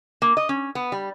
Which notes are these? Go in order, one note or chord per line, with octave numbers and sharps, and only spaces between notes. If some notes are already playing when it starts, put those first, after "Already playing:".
A#3
D#5
C#4
B3
G3